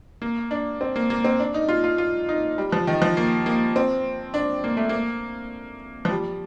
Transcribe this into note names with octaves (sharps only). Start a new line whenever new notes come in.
A#3
D4
C4
A#3
A#3
C4
D4
D#4
F4
F4
F4
D#4
G3
F3
D#3
F3
A#3
A#3
C4
D4
A#3
A3
A#3
F3
G3